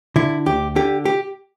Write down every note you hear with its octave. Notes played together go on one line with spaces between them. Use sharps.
D3 E4
D2 G4
D3 G4
G4